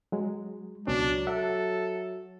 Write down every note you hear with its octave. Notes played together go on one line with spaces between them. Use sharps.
F#3 G#3
C#2 B2 F#3 C#4 D4
A4 E5 F#5